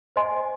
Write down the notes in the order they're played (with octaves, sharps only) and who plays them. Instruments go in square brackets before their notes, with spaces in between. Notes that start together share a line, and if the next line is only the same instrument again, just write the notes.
[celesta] C5 D#5 G#5 C6